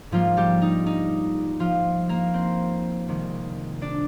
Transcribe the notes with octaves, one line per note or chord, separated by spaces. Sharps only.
G#2 F3 G3 A#3 F4
G3 G4
D#4
D#4
F3 F4
A#3 A#4
C4 C5
C2 C3 D#3 G#3 C4
D4 D5